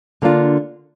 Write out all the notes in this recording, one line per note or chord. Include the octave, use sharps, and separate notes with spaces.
D3 A#3 D4 F4